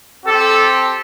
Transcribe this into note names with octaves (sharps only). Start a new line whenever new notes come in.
C4 G4 A4